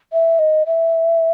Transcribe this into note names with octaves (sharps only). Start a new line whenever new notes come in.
E5
D#5
E5